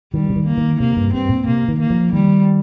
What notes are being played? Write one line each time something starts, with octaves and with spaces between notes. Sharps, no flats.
D#3 G3
C3
D#3
A#3
D#3
C3 A#3
G2
G2 C4
A#2
C3 A#3
D#3
A#3
F3
D#3 G3